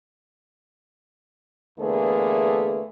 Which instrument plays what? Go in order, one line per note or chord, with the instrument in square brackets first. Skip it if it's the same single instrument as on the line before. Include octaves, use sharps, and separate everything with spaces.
[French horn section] E2 D3 A3 A#3 G#4 B4